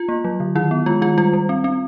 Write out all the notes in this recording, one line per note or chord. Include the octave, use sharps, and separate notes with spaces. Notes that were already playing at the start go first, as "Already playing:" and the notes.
Already playing: F4
A#3
F#3
D3
D#3 E4
B3
G#3 F4
D#3 F4
G3 F4
G3
C4
C4